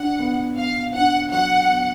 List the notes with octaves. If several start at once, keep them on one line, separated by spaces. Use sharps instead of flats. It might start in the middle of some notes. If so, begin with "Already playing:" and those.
Already playing: D4 F#5
B3
B3 F5
D4 F#5
F#3 F#5
B3